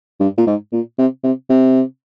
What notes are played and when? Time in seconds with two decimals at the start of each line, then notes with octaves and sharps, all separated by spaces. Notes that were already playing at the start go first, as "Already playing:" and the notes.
0.20 G2
0.37 A#2
0.47 G#2
0.72 A#2
0.98 C3
1.24 C3
1.49 C3